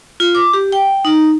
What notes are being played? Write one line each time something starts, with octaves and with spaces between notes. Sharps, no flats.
F4
D6
G4
G5
D#4